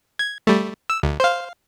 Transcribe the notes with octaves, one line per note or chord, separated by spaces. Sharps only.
G#6
G3 A3
E6
D2
C5 F5